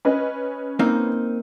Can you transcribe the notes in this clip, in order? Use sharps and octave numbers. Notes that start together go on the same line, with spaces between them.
C#4 B4 D#5
A#3 C4 D#4